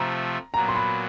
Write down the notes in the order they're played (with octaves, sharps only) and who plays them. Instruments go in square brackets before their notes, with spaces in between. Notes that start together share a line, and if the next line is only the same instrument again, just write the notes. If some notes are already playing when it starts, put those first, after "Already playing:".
Already playing: [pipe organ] C3 F3 A3 [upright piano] A#5
[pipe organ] A#2 F#3 B3 [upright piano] A#5
[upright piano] C6
B5